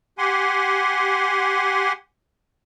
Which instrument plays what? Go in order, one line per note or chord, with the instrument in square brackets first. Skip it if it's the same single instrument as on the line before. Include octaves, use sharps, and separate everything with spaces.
[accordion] G4 F#5 G#5 C6